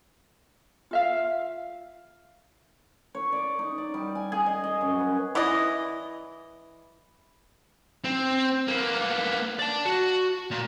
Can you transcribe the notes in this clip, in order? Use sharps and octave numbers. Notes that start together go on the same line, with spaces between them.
F4 E5 F5
C#5
D5
D#4
D5
G3
G#5
G#4
D#5
D#5
F#2
B4
E3 E4 D5 D#5
C4
A#3 B3
D5 A5
F#4
A#2